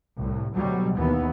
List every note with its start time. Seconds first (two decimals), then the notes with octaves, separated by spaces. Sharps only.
0.16 C2 A2
0.55 D2 B2 F#3 G3
0.95 D#2 E3 B3